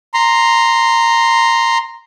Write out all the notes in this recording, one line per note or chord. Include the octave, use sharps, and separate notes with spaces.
A#5 C6